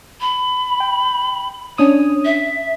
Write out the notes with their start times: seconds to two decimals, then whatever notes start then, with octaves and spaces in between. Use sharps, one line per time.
0.21 B5
0.80 G5
1.78 C#4 D4 C#5 D#6
2.25 E5